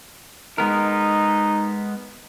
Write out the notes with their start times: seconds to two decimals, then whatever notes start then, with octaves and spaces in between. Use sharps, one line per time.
0.58 G#3 B3 D#4 A#4